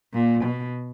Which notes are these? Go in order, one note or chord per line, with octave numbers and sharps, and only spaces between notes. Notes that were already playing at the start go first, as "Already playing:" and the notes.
A#2
B2